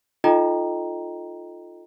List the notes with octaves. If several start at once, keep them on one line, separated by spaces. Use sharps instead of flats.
D#4 F4 A4 D#5 G5 A#5